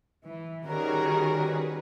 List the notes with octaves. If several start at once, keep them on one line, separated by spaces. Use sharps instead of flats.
E3
D#3 G3 C#4 F#4 G#4 A#4
B4